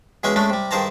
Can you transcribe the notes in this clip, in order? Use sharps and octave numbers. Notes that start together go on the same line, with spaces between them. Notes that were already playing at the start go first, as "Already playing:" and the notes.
B2 E3 G#3 C#4 G#4 G#5
G#3 A3 C#4 D4
C3 G3
G2 D#3 G#4 C5 A5 A#5